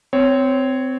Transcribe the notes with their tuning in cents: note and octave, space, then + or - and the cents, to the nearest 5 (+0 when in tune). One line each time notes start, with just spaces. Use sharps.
C4 -20 C#5 +0